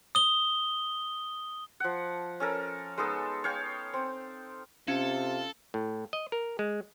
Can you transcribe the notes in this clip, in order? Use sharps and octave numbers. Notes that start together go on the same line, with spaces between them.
D#6 G7
F3 F#5
C#4 A4 A#4
G#3 B3 D#4 A4
C#5 F5 G5
C4
C3 C#4 F4 A4
A2
D#5
A#4
G#3